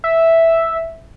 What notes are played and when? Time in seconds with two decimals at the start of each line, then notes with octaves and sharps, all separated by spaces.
0.04 E5